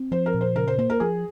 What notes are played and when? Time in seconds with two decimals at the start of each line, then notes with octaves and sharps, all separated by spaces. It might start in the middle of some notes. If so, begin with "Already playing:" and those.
Already playing: C4
0.11 F3 C5
0.26 A#4
0.34 A#2
0.41 C5
0.56 C#3 A#4
0.68 C5
0.78 A#3 C5
0.90 A#4
1.00 F3 G#4